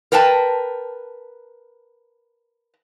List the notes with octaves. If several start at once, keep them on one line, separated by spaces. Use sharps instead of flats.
A#4 B4 G5 A5